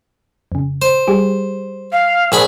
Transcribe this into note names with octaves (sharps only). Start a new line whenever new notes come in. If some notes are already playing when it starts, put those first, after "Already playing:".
F2 C#3
C5
G3 G4 G#4
F5
A#1 F3 G#4 B5